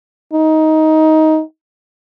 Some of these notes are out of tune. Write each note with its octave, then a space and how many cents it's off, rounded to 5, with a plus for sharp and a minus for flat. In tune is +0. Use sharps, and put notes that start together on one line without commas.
D#4 +15